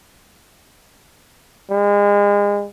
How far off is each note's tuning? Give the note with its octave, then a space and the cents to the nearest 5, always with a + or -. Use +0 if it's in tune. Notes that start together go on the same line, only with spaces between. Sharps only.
G#3 -35